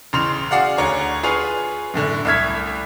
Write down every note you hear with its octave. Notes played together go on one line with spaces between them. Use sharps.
A1 C#3 C6 F7
F#4 G#4 D5 F5 F#5
D2 C#5 A#5 C#6
F4 G#4 B4 C#6 F7
F#2 A2 D3
C2 A3 E5 F6 G#6 B6